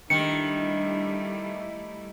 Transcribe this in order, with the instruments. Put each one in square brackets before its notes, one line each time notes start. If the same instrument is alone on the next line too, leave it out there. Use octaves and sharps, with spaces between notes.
[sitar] D#3 [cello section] G3 A3 E4 [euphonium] D4 [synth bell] C#7